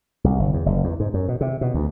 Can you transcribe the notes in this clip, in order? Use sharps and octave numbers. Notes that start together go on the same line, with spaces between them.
C2
G1
E2
F#1
E2
G#2
F#2
B2
C3
B2
D2